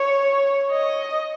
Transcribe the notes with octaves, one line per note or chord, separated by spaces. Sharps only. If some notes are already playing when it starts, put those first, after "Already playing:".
Already playing: C#5
D#5